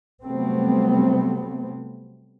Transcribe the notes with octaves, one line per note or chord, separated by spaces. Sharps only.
C3 F#3 G3 A3 B3 C4